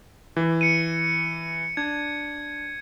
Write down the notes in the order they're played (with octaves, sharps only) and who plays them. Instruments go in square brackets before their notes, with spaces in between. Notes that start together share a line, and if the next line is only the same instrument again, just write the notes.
[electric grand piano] E3
[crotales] C#7 D#7
[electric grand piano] D4 [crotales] G#6